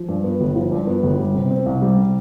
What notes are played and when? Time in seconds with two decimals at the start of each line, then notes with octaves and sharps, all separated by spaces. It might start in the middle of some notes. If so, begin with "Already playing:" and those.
Already playing: F3
0.09 G2
0.24 B3
0.41 G1
0.56 F3
0.72 G2
0.87 B3
1.03 G1
1.19 G3
1.34 C3
1.51 C4
1.66 C2
1.82 G3
1.98 C3